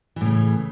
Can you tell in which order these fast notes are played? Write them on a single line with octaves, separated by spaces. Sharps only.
E3 A2 C#3